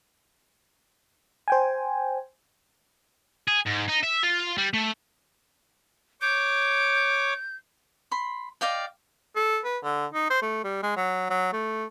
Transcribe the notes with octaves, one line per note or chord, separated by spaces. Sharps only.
C5 G5 G#5
G#4
G#2
D#4
E5
F4
G3
A3
C#5 D6 G6
B5 C6
D5 D#5 F5 G5
A4
B4
D3
D#4
C5
A3
G3
G#3
F#3
F#3
A3